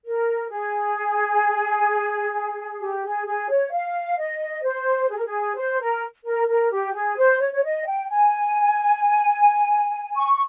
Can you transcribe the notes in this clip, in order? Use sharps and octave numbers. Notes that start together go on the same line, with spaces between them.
A#4
G#4
G4
G#4
G#4
C#5
F5
D#5
C5
G#4
A#4
G#4
C5
A#4
A#4
A#4
G4
G#4
C5
C#5
C#5
D#5
G5
G#5
C#6